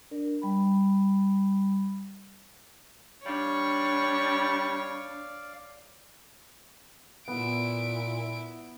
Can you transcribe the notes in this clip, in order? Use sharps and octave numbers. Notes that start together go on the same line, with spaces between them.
D4 A#4 D5
G3 B5
G3 D4 C#5 D5 F5
A#2 B3 E4 D7